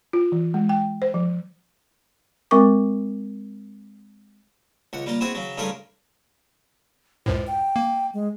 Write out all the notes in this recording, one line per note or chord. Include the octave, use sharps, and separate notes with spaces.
F4
E3
G#3
G5
C5
F3
G#3 C4 A#4 C#6 D6
C#2 F#5
G3 A#3 F4
B3 C4 E4 F#4 G#4
C#3 F#3
G2 C#3 A3 F4 G#4 A#4
C#2 F#2 A2 C5
G5
A#3
G#3